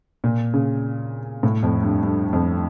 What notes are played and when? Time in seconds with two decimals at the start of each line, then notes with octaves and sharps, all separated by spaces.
0.24 A#2
0.54 C#3
1.43 A2
1.63 F2
1.83 G2
2.03 G2
2.33 F2